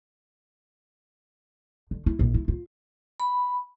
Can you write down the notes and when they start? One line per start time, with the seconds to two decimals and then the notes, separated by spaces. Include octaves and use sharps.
1.91 D3
2.06 E4
2.19 A#1
2.34 E4
2.48 F4
3.20 B5